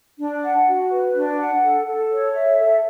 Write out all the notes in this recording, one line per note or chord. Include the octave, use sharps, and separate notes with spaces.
D4
F#5
F#4
B4
D4
F#5
A4
A4
C#5
E5
A4